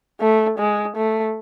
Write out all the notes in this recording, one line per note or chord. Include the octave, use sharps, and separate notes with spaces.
A3
G#3
A3